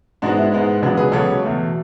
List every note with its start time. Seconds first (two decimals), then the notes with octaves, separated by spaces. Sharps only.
0.22 G#2 G#3 B3 D4 F#4
0.37 E4
0.52 G#2 G#3 B3
0.82 C#2 C#3 F#3 B3 D4
0.97 G#4 B4
1.12 C#2 C#3 F#3 B3 A4 C#5
1.43 E2 B2 A3